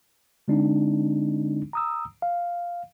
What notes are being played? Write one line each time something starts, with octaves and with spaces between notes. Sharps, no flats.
D3 G#3 C4 D4 D#4
A#5 D#6 E6
F5